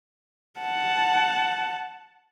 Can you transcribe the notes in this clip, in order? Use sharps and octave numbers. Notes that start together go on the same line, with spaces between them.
F#5 A5